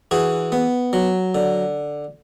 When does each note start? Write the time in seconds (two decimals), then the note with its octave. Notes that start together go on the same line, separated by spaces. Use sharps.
0.11 E3 F#4 G#4
0.52 B3
0.93 F#3
1.35 D3